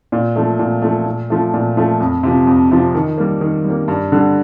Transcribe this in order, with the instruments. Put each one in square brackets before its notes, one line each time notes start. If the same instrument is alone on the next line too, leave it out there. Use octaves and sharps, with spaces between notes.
[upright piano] A#2
F3 A3
A#2
F3 A3
A#2
F3 A3
A#2
F3 A3
F2
C3 F3
F2
C3 F3
D#3
G3 A#3
D#3
G3
A#3
G2
D3 G3